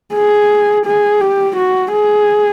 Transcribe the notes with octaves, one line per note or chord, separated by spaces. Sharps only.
G#4
G#4
G4
F#4
G#4